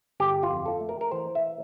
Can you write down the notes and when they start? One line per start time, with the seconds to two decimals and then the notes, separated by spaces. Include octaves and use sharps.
0.20 G1 G4
0.43 F4
0.50 F2
0.66 A4
0.80 A3
0.89 A#4
1.01 A#4
1.11 E3 C5
1.35 E5